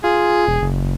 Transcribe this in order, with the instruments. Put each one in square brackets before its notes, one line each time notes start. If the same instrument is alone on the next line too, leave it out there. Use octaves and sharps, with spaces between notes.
[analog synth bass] F4 [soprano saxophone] G#4
[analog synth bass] E1
F#1